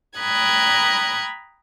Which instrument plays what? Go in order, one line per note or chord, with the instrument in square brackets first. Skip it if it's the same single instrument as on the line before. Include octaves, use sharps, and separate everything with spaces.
[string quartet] G5 A#5 B5 D#6 F#6 G#6